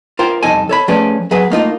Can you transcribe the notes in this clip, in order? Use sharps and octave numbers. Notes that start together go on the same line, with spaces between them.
F4 A#4 C5 G5
C2 F2 D#4 A4 G#5
A4 C#5 B5
F3 A3 C#4 G#4 B4 D5
F#3 G#4 B4
A3 A#3 D#4 F4